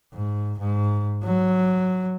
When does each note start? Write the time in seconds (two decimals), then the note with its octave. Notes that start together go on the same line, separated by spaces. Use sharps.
0.14 G#2
0.59 G#2
1.23 F#3